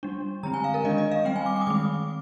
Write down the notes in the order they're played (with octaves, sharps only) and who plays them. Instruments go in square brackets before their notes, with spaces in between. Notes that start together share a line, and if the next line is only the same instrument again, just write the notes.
[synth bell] G3 D4
D3 G#3 C4 A#5
G#5
F5
A#4
D#3 G#3 D4 D#5
D#5
F5
G3 C4 G5
G#5
D6
D6
D#6
D#3 G#3 C4 D6